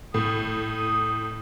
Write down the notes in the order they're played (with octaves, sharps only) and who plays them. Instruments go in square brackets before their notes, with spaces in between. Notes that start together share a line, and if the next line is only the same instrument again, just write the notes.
[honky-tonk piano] A2 [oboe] D#6